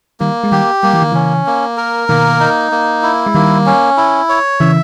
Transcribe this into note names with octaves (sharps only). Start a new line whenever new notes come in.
D#3 G3 A#3
G#3
D#3 G3 G4
G3 A#3
E3
D#3
C#3 E3 C#4
A#3
A#4
B2 D#3 A#3
D#4
A#3
E4
G#3
D#3 G3 A#3
C#4
E4
C#5
C#3 E3 E5